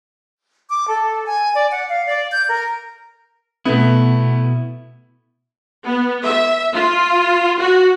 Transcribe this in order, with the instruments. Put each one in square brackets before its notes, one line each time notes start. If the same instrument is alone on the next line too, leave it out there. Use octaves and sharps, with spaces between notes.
[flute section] D6
A4
G#5
D5
F#5
F5
D5
G6
A#4
[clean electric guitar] B2 E4 [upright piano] A3 B3
[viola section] B3
E5
F4
F#4